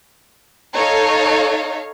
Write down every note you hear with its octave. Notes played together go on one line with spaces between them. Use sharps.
D#4 A4 C#5 F5